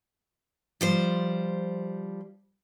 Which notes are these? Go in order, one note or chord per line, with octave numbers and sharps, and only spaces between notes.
F3 G3 C5